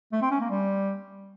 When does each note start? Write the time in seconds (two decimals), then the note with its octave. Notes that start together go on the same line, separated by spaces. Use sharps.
0.12 A3
0.22 C4
0.31 C#4
0.41 A#3
0.50 G3